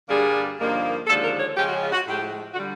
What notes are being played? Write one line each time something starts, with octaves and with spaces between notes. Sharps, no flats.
G2 D3 G3 A#3 D4 G#4
G2 D3 F3 A#3 D#4
D#2 D3 F3 G#3 A4
A#4
C#5
C#3 F3 G#3 C#4 G4
F#4
F4
F#4
A2 F3 G#3 G4
D3 G3 F#4